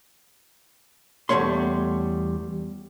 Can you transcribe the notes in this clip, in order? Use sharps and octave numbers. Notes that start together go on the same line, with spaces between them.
E2 C#3 G3 A3 C#5 C6